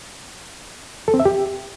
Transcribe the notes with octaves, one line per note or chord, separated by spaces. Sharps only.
A4
C4
E5
G4